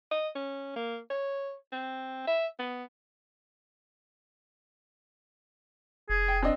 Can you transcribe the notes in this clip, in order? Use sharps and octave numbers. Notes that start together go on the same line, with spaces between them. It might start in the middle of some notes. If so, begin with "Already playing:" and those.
D#5
C#4
A#3
C#5
C4
E5
B3
F1 G#4
G5
C4 D4 D#5